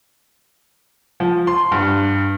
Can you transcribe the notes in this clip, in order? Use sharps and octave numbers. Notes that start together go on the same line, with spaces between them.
F3
C6
G2